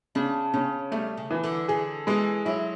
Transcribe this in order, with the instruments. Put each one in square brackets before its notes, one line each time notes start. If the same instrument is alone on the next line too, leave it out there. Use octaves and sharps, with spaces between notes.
[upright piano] C#3 [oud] D4
[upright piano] C#3 [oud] C#4
[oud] G3 [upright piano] A3
[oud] C#3
[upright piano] E3
[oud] D3
[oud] D3 [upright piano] G#4
[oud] E3 [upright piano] G#3
[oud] F#3 [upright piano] E4